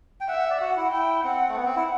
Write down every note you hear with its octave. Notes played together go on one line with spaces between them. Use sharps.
G5
E5 F#5
F#5
D5
F#4 F#5
E4
E4 G5
C4 F#5
A3
B3 F#5
C4
E4